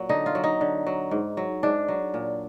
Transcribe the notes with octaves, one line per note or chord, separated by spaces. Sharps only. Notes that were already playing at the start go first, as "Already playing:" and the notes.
Already playing: A#2 F#3
D3 D#4
F4
F#3
D#4
D3
F#3
G#2
F#3
G#2 D4
F#3
A#2